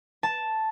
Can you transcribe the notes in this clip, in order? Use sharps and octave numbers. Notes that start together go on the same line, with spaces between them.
A5